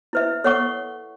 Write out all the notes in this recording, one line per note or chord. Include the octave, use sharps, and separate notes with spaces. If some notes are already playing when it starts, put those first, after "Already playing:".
E4 B4 E5
A4 C#5 F#5 C#6